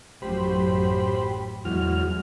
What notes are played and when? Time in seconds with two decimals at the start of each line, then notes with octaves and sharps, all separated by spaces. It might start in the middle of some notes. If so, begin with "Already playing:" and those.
0.22 A1 F#2 F#3 G4 C5 B5
1.65 E2 F#3 G#3 F6